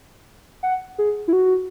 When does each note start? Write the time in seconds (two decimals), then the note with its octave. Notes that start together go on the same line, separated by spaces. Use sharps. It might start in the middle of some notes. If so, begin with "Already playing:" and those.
0.63 F#5
0.98 G#4
1.28 E4
1.33 F#4